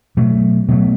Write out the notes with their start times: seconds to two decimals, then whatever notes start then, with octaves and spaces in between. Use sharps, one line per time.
0.17 B2 F#3 A3
0.68 B2 F#3 A3